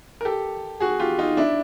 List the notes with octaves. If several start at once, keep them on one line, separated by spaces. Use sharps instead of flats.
A#4
G4 A4
F#4 G#4
F4 G4
D#4 F4
D4 E4